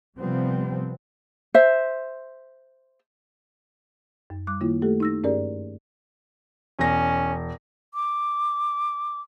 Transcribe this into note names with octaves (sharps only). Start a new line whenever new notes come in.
C3 F3 G3 B3 C4
C5 E5
F#2
G3 D6 F#6
D#3 A#3 E4 F4
A3 G4 A4
D#4 E6 A#6
G2 C#4 G4 G#4 A#4 D5
E1 C#4 A#6
D6